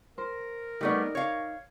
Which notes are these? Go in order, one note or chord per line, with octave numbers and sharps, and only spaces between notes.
A#4 C5
G3 A3 B3 D#4 D5
C#5 F5